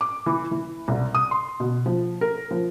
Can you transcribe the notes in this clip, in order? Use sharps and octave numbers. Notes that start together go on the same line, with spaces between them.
D6
E3
E3
C2
D#6
C6
B2
F3
A#4
F3